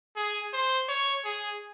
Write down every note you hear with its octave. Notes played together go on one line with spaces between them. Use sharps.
G#4
C5
C#5
G#4